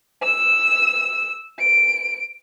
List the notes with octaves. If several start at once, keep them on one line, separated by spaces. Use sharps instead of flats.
E6 E7
D7